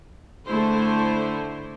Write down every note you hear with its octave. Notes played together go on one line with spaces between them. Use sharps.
D3 A3 E4 C5